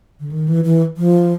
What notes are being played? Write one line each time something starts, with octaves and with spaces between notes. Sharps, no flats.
D3
D#3
E3
E3
F3